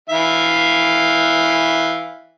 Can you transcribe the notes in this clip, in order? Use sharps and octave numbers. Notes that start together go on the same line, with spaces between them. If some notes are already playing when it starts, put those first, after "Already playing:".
E3 E5 F5